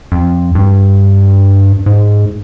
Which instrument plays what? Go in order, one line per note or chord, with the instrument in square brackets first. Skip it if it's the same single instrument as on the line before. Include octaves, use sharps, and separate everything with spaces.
[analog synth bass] F2
G2
G#2